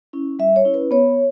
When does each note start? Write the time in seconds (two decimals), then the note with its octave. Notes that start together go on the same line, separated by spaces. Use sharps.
0.13 C#4 E4
0.39 G3 E5
0.56 C#5
0.65 C#4 E4
0.74 B4
0.91 B3 C#5